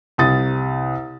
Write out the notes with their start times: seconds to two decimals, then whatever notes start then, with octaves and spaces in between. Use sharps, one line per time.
0.18 C2 D#6 A6